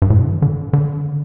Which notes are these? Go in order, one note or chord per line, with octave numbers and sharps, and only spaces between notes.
G2
A2
B2
D3
E3
D3
D3